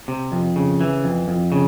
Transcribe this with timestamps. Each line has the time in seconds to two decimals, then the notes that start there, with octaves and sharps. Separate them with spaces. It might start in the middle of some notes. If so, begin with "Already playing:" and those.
0.08 C3
0.32 F2
0.56 C#3
0.81 E3
1.04 F2
1.28 F2
1.52 C#3